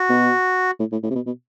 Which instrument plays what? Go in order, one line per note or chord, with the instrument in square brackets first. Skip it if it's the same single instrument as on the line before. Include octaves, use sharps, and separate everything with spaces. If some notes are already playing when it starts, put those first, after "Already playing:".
Already playing: [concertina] F#4
[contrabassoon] B2
A2
A2
A2
C3
B2
B2